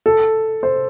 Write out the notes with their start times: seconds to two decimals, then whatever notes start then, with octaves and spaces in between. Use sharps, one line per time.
0.06 A4
0.63 C5